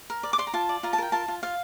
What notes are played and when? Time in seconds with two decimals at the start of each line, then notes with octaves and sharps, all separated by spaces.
0.10 A#4
0.23 D5
0.33 D6
0.38 D5 C6
0.47 A#5
0.54 F4 A5
0.69 D5
0.83 F4 A#5
0.93 A5
0.98 A#4 G5
1.12 F4 A5
1.28 F4
1.43 F4 F5